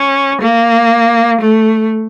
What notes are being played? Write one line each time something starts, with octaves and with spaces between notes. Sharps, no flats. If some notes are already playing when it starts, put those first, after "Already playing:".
Already playing: C#4
A#3
A3